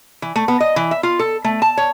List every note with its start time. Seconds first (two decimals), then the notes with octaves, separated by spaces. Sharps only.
0.22 E3
0.36 A3
0.48 B3
0.60 D#5
0.76 E3
0.91 E5
1.03 F4
1.19 A4
1.44 A3
1.62 A5
1.78 C#5